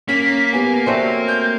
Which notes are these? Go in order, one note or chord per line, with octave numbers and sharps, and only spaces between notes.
A#3 C#4 B6
B3 G4 G#5
A3 C4 F#4 C#5 D5
G6